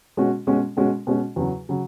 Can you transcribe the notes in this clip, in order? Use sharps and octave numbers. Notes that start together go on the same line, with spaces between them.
B2 G#3 C#4 F#4
B2 G#3 C#4 F#4
B2 G#3 C#4 F#4
B2 G#3 C#4 F#4
E2 C#3 F#3
C#3 F#3